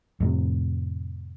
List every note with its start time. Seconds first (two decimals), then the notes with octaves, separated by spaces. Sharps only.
0.20 F2 A2 C3